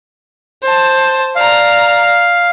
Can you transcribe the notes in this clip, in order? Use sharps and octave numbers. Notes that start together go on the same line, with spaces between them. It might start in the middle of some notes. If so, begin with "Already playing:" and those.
C5 A5
D5 F5 A#5